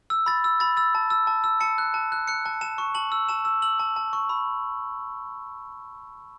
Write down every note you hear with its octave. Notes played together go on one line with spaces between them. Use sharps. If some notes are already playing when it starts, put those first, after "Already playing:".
E6
B5 A6
E6
B5 A6
E6 A6
A5
E6
A5
E6
A5 C#7
F#6
A5
F#6
F#6 C#7
A5
A5 E7
C#6
A5 F#7
E6
A5 E7
E6
E6 F#7
A5
A5
C#6
B5